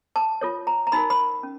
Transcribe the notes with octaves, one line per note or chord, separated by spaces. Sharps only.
A5
F4 A4 C#5
A#5
A#5
D#4 F#4 A#4 B5
B5
C#4